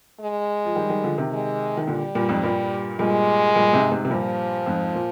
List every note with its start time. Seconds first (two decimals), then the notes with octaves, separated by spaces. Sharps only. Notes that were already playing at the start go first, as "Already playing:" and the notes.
0.20 G#3
0.65 F3
0.75 D#3 G3
0.89 D#3 G3
1.03 D3 F3
1.18 C3 D#3
1.32 G#3
1.77 D#3
1.87 A#2 D3 G3
2.15 G2 A#2
2.29 F2 G#2
2.43 G2 A#2
2.99 G2 A#2 G#3
3.55 G2 A#2
3.73 G#2 C3
3.92 G#2 C3
4.05 C3
4.10 G2 A#2 F3
4.66 F2 G#2
4.95 A#2